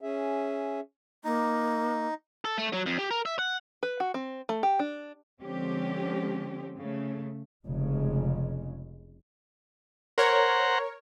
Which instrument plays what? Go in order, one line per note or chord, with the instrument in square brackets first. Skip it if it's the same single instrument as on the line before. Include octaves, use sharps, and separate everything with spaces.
[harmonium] C#4 G#4 E5
[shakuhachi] A#3 [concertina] D#4
[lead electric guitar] A4
A3
F#3
F2
G4
A#4
E5
F#5
[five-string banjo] B4
F#4
C4
A3
G4
D4
[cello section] D3 F3 G#3 C4 C#4 G4
C#3 A3
[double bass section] F1 C#3 G#3
[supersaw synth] A#4 C#5 [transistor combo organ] C5 F#5 A#5